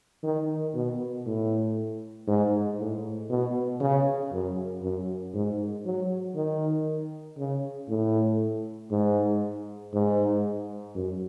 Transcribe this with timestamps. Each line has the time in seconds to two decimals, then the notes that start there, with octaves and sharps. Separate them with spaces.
0.23 D#3
0.74 B2
1.26 A2
2.27 G#2
2.79 A2
3.30 B2
3.80 C#3
4.33 F#2
4.83 F#2
5.34 G#2
5.85 F#3
6.36 D#3
7.38 C#3
7.89 A2
8.91 G#2
9.94 G#2
10.95 F#2